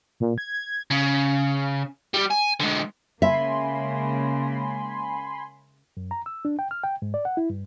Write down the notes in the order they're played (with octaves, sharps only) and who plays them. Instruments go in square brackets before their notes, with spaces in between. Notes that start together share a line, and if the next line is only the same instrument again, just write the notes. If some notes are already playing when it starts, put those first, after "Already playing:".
[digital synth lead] A#2
G#6
G#6
[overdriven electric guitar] C#3
G3 G4
G#5
D3 G#3
[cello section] C#3 G#3 A#3 [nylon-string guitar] E5 [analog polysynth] G#5 B5 C6
[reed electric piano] F#2
A#5
E6
D4
G5
F6
G5
G#2
D5
F#5
E4
G2